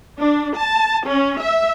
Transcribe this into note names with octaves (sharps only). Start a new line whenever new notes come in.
D4
A5
C#4
E5